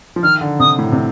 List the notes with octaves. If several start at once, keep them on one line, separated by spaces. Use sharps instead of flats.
F3
D#3 F6
D3
C3 D#6
A2
C3